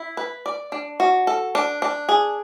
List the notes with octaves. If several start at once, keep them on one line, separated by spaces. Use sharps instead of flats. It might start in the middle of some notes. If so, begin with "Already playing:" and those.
Already playing: E4
B4
D5
D4
F#4
A4
D4
D4
G#4